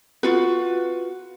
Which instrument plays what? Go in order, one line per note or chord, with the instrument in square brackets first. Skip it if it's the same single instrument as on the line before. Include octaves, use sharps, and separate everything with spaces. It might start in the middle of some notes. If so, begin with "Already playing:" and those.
[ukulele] F4 F#4 B4